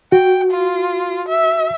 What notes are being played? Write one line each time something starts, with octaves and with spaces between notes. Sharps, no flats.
F#4 G5
F4
E5